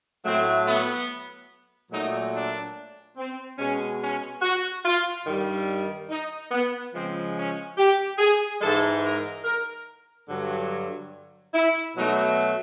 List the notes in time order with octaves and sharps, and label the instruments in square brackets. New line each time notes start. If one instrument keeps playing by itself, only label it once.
[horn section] A2 F#3 A3 C4
B3
A#2 F#3 A3 D#4
D4
C4
B2 G#3 C#4
C#4
F#4
F4
G2 D#3 G3
D#4
B3
C#3 F3 G#3 C4
C#4
G4
G#4
G#2 E3 G#3 A4
A#4
A#4
G2 D3 F#3
E4
B2 F#3 A3 D#4